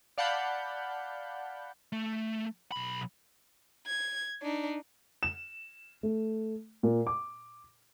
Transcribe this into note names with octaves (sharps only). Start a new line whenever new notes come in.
D5 F5 F#5 A5 B5 G6
A3
B1 B5
G#6
D4 D#4
E7
A3
A#2
D6